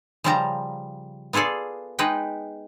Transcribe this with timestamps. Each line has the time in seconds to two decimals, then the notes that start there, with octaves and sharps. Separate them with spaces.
0.24 C#3 F3 G3 G4 A5 A#5
1.33 B3 F4 G#4 A4 D5
1.99 G#3 D#4 B4 G5